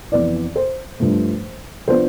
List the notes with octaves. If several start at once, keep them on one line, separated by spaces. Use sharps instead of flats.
F2 E3 B3 E4 D5
C5
G2 F3 A3
F3 B3 D4 F4 C5